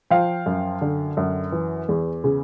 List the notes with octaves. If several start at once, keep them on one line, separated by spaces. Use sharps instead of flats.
F3 F5 G5
F#2
D3
F#2
E3
E2
C#3